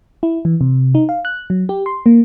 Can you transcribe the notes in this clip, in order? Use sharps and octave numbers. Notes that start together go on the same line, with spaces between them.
E4
E3
C3
D#4
F5
F#6
F#3
G4
C6
A#3